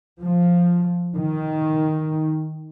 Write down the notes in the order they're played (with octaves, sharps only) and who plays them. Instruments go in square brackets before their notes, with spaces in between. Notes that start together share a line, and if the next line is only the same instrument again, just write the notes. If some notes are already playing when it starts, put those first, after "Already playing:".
[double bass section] F3
D#3